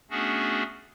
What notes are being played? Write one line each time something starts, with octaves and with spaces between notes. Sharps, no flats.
A3 B3 C#4 D4 F#4 G#4